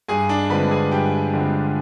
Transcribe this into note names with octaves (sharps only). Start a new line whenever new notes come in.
G2 G#4 G#5
D4 D5
D3 F3 G#3 C4 B4 B5
G#4 G#5
G2 G4 G5
D3 F3 G#3 C4